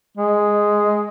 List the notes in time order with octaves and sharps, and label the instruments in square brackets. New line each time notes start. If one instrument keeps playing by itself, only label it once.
[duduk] G#3